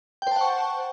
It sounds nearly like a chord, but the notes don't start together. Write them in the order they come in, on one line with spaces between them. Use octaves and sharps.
G5 C5 A5 F#5 C#6